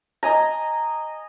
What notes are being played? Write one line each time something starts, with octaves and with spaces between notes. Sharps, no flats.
D#5 G#5 A#5